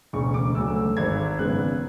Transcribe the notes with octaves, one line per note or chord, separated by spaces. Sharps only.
E1 D2 C#3 C#6
D6
D2 C#3 F#3 A3 E6
E6
G#1 G#2 G#3 G#6
G#1 F#2 C#3 G#3 B3 F#6